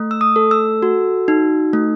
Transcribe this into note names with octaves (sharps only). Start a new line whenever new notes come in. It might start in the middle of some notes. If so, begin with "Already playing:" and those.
Already playing: A3
E6
D#6
A4
E6
F#4
D#4
A3